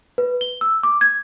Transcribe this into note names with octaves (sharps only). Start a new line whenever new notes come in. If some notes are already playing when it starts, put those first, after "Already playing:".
B4
G7
E6
D6
G#6